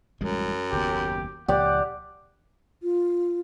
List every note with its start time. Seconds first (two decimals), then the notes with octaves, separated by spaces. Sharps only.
0.21 A1 F#2 G3 G#3
0.72 F#1 D#2 B3 G4
1.48 C#2 A#2 F3 G4 D5 F#5
2.83 F4